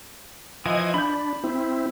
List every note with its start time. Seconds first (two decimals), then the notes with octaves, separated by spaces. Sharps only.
0.66 E3 F3 D#5 G#6
0.94 D4 B5 G6
1.44 C4 E4